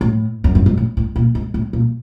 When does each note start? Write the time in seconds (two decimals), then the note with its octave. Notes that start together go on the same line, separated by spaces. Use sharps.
0.01 A2
0.44 F#2
0.55 G2
0.66 G#2
0.77 A2
0.97 A2
1.16 A#2
1.35 G#2
1.54 A2
1.73 A#2